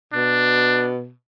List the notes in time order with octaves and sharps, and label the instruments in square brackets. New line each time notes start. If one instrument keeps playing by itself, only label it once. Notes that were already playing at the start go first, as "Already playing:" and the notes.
[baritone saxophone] B2 [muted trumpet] D4